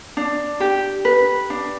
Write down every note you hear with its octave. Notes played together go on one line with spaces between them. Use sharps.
D4
G4
B4
D4